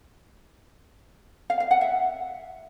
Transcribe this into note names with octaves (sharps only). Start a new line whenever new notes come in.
F5
F5
F#5
E5